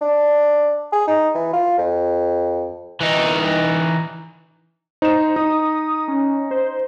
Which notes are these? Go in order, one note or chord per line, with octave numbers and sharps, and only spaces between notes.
D4
G#4
D#4
E3
F4
F2
E3 D#4
D#4 C5 E7
D#4 D#6
C#4
C5